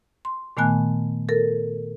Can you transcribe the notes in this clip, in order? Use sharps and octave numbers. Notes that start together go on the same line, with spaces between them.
C6
A#2 D#3 A3 B3 G#5 F#6
A4 A#4